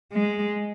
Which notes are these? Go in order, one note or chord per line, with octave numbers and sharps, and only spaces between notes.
G#3